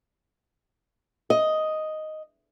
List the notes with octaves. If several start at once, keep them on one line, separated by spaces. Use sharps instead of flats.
D#5